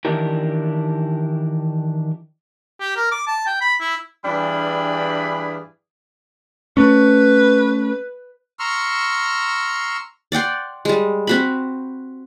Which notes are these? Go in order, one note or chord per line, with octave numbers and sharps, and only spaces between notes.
D#3 E3 D4 E4 G4 A#4
G4
A#4
D6
A5
G5
B5
E4
G2 E3 G3 D4 G#4 B5
A3 C#4 B4
A#5 C6 C#6 E6 F6
D5 F#5 G5 C6
G3 G#3
C4 F#4 B5